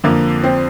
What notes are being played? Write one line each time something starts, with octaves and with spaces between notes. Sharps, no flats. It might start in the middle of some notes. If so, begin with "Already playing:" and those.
F2 D3 A#3
C4